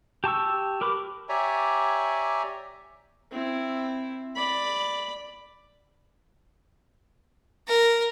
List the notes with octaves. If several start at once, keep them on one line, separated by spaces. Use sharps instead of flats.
G4 A5 C#6 E6
G4 A#4 B4 B5 D6
G4 C#5 D5 E5 G#5 A#5
C4 E4
D5 B5
A#4